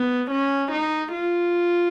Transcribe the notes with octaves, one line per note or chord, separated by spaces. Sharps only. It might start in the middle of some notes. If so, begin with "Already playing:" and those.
Already playing: B3
C#4
D#4
F4